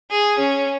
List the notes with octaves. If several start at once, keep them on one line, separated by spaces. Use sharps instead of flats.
G#4
C#4